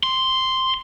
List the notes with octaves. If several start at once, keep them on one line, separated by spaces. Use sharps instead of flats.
C6